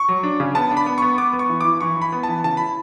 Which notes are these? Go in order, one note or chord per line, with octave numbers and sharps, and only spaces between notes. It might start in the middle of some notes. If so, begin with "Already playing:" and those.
Already playing: C#6
F#3
D4
C#3
B3 A5
D4
B5
B3
B3 C#6
B3 D6
B3
C#6
E3
E4 D6
E3 C#6
E4
B5
B3
E3 A5
C#3 A5
E4 B5